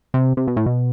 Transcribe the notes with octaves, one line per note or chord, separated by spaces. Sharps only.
C3
C3
B2
A2
B2